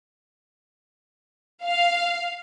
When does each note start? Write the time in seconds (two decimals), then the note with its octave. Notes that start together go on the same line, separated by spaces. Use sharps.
1.63 F5